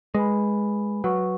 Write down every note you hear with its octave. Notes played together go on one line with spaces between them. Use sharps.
G#3 B4 G#5 B5
F#3 B4 F#5 C#6